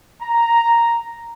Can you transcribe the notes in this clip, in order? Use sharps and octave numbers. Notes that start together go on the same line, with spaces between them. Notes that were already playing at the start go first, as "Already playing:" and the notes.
A#5